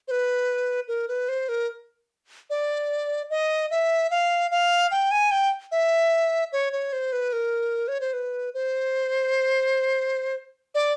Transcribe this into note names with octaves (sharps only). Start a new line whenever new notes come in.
C5
B4
A#4
B4
C5
A#4
D5
D#5
E5
F5
F5
G5
G#5
G5
E5
C#5
C#5
C5
B4
A#4
C#5
C5
B4
C5
D5